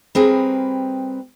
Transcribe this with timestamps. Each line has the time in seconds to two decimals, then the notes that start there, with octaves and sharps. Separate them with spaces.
0.15 G3 C4 G#4 A#4 B4